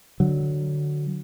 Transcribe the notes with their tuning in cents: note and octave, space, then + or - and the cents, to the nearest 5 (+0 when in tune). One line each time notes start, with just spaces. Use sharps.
D3 +10 F#3 +0